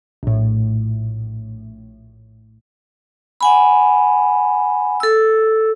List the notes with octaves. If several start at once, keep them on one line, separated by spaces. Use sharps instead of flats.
A#1 A2
F#5 G#5 B5
A4 E6